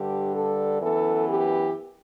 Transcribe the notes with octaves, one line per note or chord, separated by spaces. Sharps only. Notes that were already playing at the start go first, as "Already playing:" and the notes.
Already playing: G2 D3 G3 G4
A4
F#2 E3 B3 A4
G4